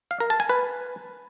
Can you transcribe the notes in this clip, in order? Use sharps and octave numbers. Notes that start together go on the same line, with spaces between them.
F5
A#4
A5
G#5
B4